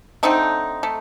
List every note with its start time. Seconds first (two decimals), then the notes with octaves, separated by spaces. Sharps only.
0.23 D3 A3 C4 D#4
0.83 A3